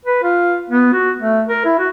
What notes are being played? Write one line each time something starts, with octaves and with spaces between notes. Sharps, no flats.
B4
F4
B3
F#4
A3
A#4
E4
F#4